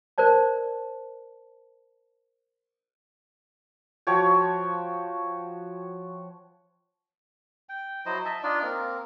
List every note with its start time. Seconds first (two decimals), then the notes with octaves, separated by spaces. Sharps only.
0.18 A#4 C5 D5 A5
4.07 F3 F#4 C#5 G5
7.69 G5
8.06 F#3 E4 C5 D#5
8.25 D#5 E5 A5
8.43 D4 D#4 F4 D5
8.63 A#3 C4 A#4